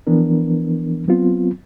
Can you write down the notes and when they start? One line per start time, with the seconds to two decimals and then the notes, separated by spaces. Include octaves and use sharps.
0.07 E3 F3 B3 D4 A#4
1.08 F#3 B3 C4 F4